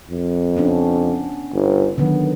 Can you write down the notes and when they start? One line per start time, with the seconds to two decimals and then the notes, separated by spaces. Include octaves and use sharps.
0.11 F2
0.57 B3 C#4 D4
1.54 G1
1.98 D3 D#3 F#3 B3